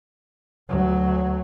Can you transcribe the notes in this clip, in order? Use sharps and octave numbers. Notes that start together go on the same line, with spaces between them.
D2 F#3